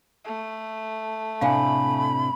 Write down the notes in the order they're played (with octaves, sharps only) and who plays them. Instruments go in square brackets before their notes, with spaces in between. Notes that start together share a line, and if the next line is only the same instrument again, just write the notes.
[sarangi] A3
[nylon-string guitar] A2 C3 D4 [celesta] F5 G#5 [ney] B5